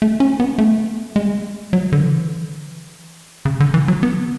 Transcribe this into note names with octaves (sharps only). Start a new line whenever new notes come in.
A3
C#4
B3
A3
G#3
F#3
D3
E3
C#3
D3
E3
F#3
B3